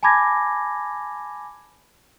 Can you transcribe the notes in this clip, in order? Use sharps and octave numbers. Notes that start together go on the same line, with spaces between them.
G#5 A5 B5 D6 G#6 A#6